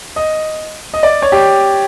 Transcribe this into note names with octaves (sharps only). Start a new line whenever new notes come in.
D#5
D#5
D5
C#5
G4